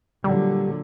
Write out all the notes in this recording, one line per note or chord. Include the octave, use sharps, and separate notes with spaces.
A#2 D3 F#3 G3